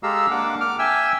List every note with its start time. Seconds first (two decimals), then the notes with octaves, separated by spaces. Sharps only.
0.03 G#3 G4 A4 F5 A#5 E6
0.31 A#3 D4 F#5 D6
0.60 D6 F6
0.79 E5 G5 G#5 E6